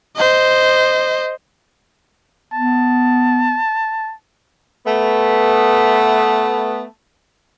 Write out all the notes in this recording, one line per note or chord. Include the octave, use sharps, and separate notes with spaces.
C5 D#5
B3 A5
A3 B3